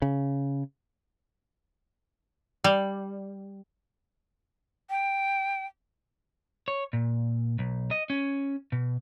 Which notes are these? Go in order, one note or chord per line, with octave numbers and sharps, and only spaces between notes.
C#3
G3
G5
C#5
A#2
B1
D#5
C#4
B2